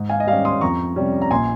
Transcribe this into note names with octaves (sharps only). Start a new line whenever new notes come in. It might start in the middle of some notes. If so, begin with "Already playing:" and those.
Already playing: G#2
F5 G#5
D#5
G3 C#4 F5
C6 D#6
F2 A#5 C#6
C3 G3 C#4
A#5
A#1 G#5 C6